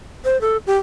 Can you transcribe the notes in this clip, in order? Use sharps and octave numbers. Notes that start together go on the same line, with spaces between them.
C5
A4
G4